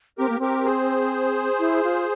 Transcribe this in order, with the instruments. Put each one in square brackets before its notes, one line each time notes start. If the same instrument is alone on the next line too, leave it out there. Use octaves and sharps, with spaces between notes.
[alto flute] C4 [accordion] G4 A#4
[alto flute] A#3
[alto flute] C4 [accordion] G4 A#4
[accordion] G#4 C5
[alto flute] E4
F4